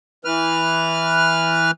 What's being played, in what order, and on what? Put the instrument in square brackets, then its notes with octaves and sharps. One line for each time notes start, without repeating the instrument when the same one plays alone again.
[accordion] E3 B4 F6